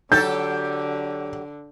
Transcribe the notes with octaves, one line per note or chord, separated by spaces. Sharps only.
D3 F#3 G4 A4 G6